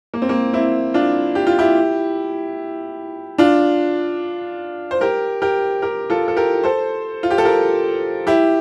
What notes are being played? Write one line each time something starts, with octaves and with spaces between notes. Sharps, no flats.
A#3
C4
A#3
C4 E4
D4 F4
G4
F4
E4 G4
D4 F4
C5
G4 A#4
G4 A#4
G4 A#4
F4 A4
A4
G4 A#4
A4 C5
F4
G4
A4
G4 A#4
E4 G4